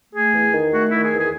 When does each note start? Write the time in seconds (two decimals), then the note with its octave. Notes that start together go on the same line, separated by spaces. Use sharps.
0.14 A3 G#4
0.33 E2
0.53 D#3
0.73 A3 F#4
0.89 D#3 E4
1.03 G#4
1.13 E2 G#4